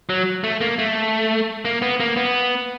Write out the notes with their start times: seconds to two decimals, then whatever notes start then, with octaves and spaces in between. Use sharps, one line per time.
0.09 F#3
0.44 A3
0.61 A#3
0.79 A3
1.65 A#3
1.82 B3
2.00 A#3
2.17 B3